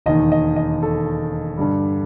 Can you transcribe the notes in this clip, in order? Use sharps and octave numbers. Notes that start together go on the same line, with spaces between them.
E1 D#2 D#3 D#5
D#5
D#5
A4
G2 D3 G3